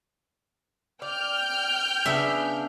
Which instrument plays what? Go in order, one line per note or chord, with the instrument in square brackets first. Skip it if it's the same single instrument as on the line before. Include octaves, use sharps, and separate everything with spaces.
[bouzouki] D5 [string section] G5 F6 G6
[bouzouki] C#3 B3 D4 [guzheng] E5